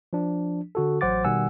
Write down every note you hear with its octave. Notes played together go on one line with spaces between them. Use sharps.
F3 D4
D3 F#4 A4
A1 F#3 C5 F#5 D6 A6
B2 D#3 G3 F#5 G#5 E6